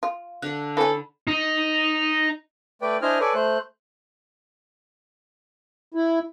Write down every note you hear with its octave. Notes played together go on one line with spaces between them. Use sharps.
F4
D3 F#5 F#6
E3 C#4 A4 B5
D#4
A3 B4 D5 G5
D4 E4 C5 D#5 G#5 F6
A4 B4 C#5 D5 G#5
A3 C5 F#6
E4